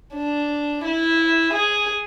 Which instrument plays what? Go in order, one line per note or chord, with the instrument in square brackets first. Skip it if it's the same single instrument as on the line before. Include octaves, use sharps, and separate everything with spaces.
[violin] D4
E4
G#4